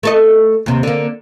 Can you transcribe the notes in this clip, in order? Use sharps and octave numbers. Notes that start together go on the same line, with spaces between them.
A3 A4 D#5
D#2 C3
D3 A#3